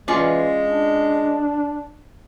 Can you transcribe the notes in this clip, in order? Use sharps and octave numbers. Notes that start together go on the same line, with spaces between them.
E3 G#3 C#4 F4 D5
D4